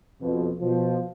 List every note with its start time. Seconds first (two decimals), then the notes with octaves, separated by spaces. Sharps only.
0.22 F2 B2
0.61 B2 F3